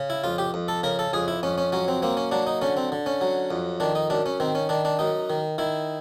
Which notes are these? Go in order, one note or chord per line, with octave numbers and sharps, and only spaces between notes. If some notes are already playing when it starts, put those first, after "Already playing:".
Already playing: C#3
E4
F2 F4
G4
F2
A4
C#3 A#4
A4
F2 G#4
E4
F2 C#4
C#4
F#3 C#4
C4
A#3 C4
C#4
F#3 D4
D#4
D3 C#4
C4
D3
C#4
F#3
F2
D#3 D4
D#4
F#2 D4
C#4
D#3 C4
C#4
D#3 D4
D4
F#2 D#4
D#3
D#3 E4